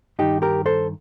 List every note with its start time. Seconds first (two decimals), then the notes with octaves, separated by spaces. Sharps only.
0.19 G2 D#3 D#4 G4
0.42 G4 A#4
0.66 A4 C5